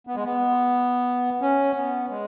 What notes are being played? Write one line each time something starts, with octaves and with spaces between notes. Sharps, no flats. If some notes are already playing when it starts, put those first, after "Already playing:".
B3
G#3
B3
C#4
B3
G#3